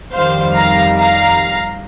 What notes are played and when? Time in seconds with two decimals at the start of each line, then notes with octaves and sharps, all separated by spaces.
0.13 F2 D#3 G3 C5 F5
0.55 F5 A#5
0.97 F5 A#5